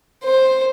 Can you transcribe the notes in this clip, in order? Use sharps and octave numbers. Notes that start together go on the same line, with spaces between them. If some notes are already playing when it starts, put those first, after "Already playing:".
C5